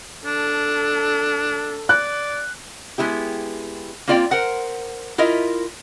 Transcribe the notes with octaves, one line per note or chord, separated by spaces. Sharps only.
D4 A4
D5 F#6
G#3 B3 E4 G4
A#3 C4 F4 D5 D#5 G5
A#4 C5 F#5
E4 F4 A#4 D#5 E5